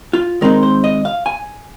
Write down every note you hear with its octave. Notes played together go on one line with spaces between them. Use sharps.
F4
D#3 G#3 C4 D#4 A#4
C5
D#5
F5
G#5